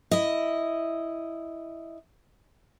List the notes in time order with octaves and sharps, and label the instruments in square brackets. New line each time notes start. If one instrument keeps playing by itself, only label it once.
[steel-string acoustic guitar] E4 D#5